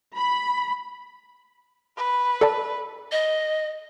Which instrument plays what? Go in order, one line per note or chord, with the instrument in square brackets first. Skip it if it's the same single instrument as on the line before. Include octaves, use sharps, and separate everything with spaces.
[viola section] B5
[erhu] B4
[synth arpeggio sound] A4 D5 A5
[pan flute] D#5